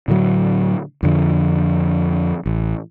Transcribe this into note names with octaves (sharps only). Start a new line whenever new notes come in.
A2 D3 F#3
F2 D3 F3
A1